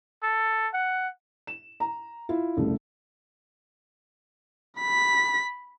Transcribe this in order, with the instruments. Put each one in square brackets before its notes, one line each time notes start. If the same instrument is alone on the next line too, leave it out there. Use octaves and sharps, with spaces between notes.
[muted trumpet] A4
F#5
[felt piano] E7
A#5
E4 F4
F1 C2 C#3 A3
[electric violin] B5 B6